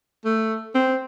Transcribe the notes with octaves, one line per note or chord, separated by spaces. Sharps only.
A3
C4